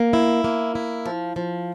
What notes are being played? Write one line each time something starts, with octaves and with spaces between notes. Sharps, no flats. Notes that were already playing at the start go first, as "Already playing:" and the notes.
Already playing: A#3
E4
A#3
E4
F3
F3